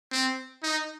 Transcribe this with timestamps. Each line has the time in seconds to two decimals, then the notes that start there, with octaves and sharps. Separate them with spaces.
0.11 C4
0.63 D#4